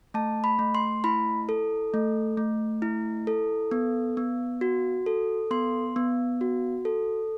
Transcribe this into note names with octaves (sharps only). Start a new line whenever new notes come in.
A3 A5
B5
A3
C6
E4 B5
A4
A3
A3
E4
A4
B3
B3
F#4
A4
B3 C6
B3
F#4
A4